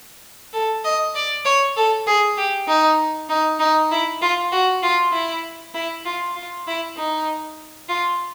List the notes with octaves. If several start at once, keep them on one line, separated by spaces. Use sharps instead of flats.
A4
D#5
D5
C#5
A4
G#4
G4
D#4
D#4
D#4
E4
F4
F#4
F4
E4
E4
F4
F4
E4
D#4
F4